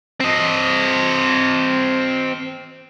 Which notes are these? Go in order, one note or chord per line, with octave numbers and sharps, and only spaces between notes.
C4 D#5